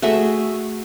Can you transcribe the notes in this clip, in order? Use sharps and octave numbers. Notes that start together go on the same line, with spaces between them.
A3 F#4 G#4 E5